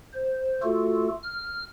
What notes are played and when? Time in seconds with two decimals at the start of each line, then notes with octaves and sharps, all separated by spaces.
0.13 C5
0.63 A3 F4 F#4 A4
1.23 F6